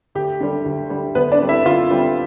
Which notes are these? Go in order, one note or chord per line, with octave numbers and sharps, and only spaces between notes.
D2 G4
D3 G3
D2
D3 G3
D2 B3 B4
D4 D5
D3 G3 C4
E4 E5
D2 F4 F5
D3 G3 C4